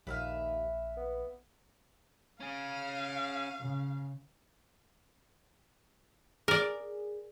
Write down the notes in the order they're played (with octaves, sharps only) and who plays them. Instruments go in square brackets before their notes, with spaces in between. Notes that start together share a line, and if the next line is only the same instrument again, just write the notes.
[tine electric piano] A#1 [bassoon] D#2 [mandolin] B4 E5 F5
[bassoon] B3
[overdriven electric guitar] C#4 G#4 [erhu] F5
[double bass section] C#3
[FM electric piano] G#4 [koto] A#4 D5